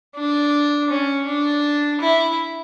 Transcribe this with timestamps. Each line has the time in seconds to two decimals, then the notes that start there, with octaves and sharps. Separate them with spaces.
0.16 D4
0.90 C#4
1.26 D4
2.01 E4